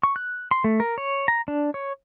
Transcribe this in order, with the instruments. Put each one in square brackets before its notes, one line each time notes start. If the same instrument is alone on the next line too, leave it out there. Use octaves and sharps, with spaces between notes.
[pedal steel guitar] C#6
F#6
C6
A3
A#4
C#5
A#5
D4
C#5